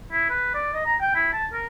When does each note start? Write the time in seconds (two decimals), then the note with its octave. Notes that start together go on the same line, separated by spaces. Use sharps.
0.12 E4
0.30 B4
0.54 D5
0.74 D#5
0.85 A#5
1.00 G5
1.15 E4
1.33 A5
1.53 A#4